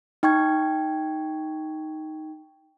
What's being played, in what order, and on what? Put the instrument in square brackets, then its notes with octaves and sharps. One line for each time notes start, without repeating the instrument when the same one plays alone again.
[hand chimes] D#4 G5 C#6 G#6